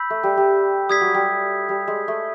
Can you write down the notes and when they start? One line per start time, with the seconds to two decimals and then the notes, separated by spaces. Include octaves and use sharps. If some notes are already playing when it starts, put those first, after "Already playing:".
Already playing: B5 E6 G6 B6
0.10 A3
0.23 G3
0.37 G3
0.89 G3 D#6 G#6 B6
1.01 F#3
1.14 G3
1.69 G3
1.88 G#3
2.08 A3